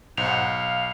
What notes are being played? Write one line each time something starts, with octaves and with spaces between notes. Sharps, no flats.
B1 G#2 C5 F#5 F7
F5